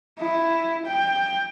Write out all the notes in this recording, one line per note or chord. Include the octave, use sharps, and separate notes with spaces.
E4
G5